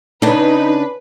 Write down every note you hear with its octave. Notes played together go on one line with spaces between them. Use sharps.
C#3 D4 D#4 B4